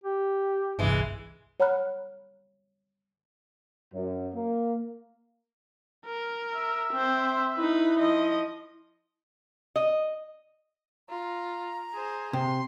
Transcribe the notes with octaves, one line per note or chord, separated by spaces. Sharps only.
G4
G1 C2 E3 G#3
C#5 F#5 A#5 B5 F6 F#6
F#2
A#3
A#4
E5
C4 C5
C6
D#4 E4 B4
F3 D#5
D#5
F4 A#5
G#4 C5
C3 C6